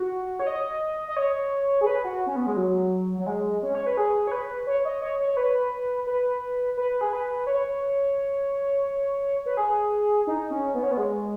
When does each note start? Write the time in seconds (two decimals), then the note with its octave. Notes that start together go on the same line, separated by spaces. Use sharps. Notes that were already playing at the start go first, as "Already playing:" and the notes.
Already playing: F#4
0.40 C#5
0.47 D#5
1.08 D#5
1.17 C#5
1.81 G#4
1.86 B4
2.04 F#4
2.26 C#4
2.36 B3
2.46 G#3
2.56 F#3
3.18 F#3
3.26 G#3
3.62 C#4
3.75 C#5
3.86 B4
3.97 G#4
4.27 C#5
4.32 B4
4.67 C#5
4.85 D#5
5.02 C#5
5.20 C#5
5.37 B4
6.07 B4
6.77 B4
7.01 G#4
7.13 B4
7.47 C#5
9.46 B4
9.57 G#4
10.27 D#4
10.51 C#4
10.74 B3
10.83 C#4
10.91 B3
10.97 G#3